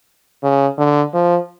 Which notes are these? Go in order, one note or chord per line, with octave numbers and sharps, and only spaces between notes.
C#3
D3
F3